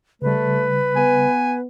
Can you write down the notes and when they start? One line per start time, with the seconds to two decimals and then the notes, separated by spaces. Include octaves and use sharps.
0.22 C#3 G3 A3 B4
0.96 B3 G#5